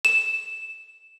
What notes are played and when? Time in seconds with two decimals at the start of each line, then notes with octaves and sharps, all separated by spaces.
0.05 E7